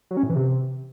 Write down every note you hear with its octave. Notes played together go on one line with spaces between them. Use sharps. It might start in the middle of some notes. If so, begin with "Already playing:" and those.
F#3
C#4
A2
E3
C3